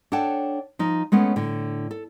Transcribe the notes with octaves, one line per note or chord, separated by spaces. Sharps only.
D4 A4 C#5 F#5 G5 A5
F3 D#4
G#3 A3 B3 C#4
A2 D3
A4